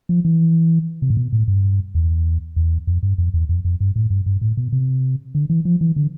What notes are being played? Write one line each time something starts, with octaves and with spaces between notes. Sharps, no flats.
F3
E3
C3
A2
B2
A2
G2
E2
E2
F2
G2
F2
E2
F2
F2
G2
A2
G2
G2
A2
B2
C3
D3
E3
F3
E3
D3